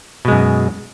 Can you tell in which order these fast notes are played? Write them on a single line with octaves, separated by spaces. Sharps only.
B2 G#3 F#2